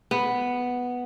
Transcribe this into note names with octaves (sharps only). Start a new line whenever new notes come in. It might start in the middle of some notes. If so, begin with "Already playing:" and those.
B3